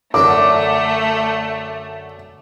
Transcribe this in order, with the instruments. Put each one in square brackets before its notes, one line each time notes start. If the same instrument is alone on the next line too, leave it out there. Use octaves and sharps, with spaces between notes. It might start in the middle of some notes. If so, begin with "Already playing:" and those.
[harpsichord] F#2 D3 F#3 [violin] A3 [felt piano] D6